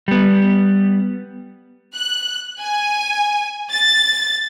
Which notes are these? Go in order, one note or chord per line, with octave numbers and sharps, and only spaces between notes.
G3 B3
F#6
G#5
A6